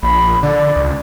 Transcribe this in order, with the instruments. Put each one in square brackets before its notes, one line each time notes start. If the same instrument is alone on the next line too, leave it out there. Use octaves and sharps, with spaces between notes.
[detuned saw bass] A#1 [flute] B5
[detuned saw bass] D3 [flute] D5
[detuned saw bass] C#2